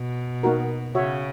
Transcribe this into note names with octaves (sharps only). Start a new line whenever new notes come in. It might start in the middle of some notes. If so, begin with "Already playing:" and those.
Already playing: B2
A#3 D#4 F#4 A#4
C#3 F#4 C#5 E5